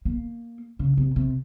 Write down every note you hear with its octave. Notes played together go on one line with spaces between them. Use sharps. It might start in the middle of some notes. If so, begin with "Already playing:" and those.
A#3
C#3
C3
C3